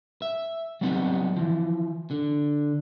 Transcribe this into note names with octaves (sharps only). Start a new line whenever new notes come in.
E5
F#3 G3 B3 C4 D#4
E3 F3
D3